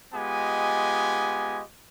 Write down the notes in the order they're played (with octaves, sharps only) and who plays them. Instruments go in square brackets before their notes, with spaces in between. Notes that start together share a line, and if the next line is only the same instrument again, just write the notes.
[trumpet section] G#3 B3 F4 G4 D#5 G#5